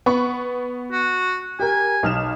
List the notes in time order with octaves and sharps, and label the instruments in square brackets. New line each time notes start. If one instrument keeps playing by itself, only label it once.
[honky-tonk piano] B3 B5 C#6
[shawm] F#4
[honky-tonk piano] G4 A#4 [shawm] G#5
[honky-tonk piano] B1 F6 E7